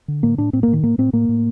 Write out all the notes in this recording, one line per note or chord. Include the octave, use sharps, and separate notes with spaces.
D3
A2 A#3
A2 D4
A2 C4
A#3
A2
D#3
A2 A#3
A2 C4
A2 A#3
A2